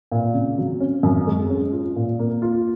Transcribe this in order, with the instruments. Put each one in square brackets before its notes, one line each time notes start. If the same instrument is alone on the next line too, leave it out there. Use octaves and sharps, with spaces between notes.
[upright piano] A#2
C#3
F#3
C#4
F#2
G#3
C#4
F4
A#2
A#3
F4